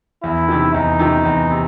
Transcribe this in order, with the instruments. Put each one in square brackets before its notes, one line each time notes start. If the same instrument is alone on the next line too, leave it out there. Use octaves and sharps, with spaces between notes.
[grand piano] E2 [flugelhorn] E4
[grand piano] C3 D#3
[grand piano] E2 [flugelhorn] D#4
[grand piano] C3 D#3
E2
C3